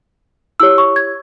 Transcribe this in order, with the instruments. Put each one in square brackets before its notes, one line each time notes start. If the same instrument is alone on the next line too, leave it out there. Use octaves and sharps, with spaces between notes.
[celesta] E4 G4 C#5 E6
C#6
G#6